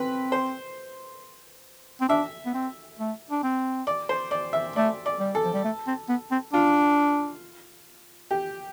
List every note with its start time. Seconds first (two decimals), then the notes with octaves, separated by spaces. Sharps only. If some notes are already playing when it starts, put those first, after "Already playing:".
Already playing: C4 B4
0.32 C5
2.01 C4
2.09 D4 E5
2.46 B3
2.54 C4
2.99 A3
3.30 D4
3.43 C4
3.87 D5
4.09 C5
4.31 D5
4.53 E5
4.76 A3 D5
5.06 D5
5.19 G3
5.35 A4
5.44 F3
5.54 G3
5.64 A3
5.87 C4
6.09 B3
6.31 C4
6.53 D4 F4
8.31 G4